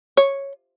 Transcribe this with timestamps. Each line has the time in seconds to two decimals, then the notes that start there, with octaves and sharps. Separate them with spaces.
0.17 C#5